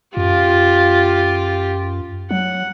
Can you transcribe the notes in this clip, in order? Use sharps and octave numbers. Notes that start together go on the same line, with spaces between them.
F#2 F4 G4
F#3 F#5